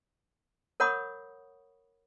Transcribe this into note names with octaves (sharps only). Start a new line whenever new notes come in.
A#4 C#5 F#5 B5 C#6 D#6